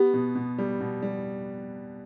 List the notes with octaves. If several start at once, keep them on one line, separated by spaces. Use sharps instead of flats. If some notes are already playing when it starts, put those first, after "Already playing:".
Already playing: B3 G4
B2
B2
G3
B2
G3